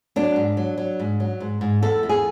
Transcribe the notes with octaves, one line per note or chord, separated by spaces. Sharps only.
F#3 D4
G#2
F#3
F#3
G#2
F#3
G#2
G#2
E2 A4
E2
G#4